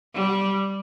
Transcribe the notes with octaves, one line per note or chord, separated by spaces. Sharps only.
G3